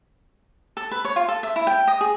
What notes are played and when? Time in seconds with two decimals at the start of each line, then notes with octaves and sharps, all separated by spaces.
0.77 A4
0.92 B4
1.05 C#5
1.16 F4
1.28 A4
1.43 E5
1.56 E4
1.67 G5
1.88 D#5
2.01 G#4